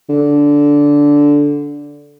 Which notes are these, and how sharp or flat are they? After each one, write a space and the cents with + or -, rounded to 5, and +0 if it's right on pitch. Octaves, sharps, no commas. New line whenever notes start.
D3 -15